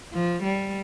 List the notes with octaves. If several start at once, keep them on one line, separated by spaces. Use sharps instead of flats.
F3
G3